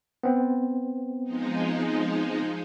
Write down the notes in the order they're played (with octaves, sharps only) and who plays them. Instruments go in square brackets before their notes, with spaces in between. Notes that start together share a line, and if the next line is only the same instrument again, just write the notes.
[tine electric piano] B3 C4
[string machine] F3 G#3 D#4